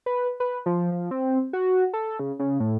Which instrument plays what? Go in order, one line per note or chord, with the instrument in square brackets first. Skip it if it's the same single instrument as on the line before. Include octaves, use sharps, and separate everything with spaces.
[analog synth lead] B4
B4
F3
F3
C4
F#4
A4
C#3
C#3
A2